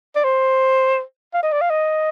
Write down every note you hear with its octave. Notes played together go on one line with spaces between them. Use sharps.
D5
C5
F5
D#5
D5
F5
D#5